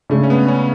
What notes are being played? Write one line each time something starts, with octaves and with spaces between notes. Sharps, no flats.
C#3 G#3 A3 D4
C#4
B3
C#4